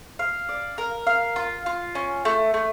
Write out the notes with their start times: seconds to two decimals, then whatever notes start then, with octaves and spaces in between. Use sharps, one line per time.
0.19 F5
0.49 D5
0.78 A#4
1.07 F5
1.36 F4
1.66 F4
1.95 C#4
2.25 A3
2.54 A3